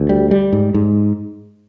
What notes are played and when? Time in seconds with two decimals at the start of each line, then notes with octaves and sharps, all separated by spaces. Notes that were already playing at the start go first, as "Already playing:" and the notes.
Already playing: D2
0.09 G3
0.31 G3
0.53 G#2
0.74 G#2